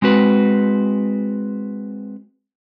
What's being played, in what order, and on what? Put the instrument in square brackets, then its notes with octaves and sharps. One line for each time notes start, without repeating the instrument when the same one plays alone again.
[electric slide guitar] G#3 C4 F#4 B4